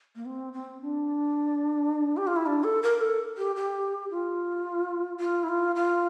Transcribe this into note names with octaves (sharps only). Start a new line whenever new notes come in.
A#3
C4
C4
D4
G4
F4
E4
D4
A4
A#4
A4
G4
G4
F4
F4
E4
F4
F4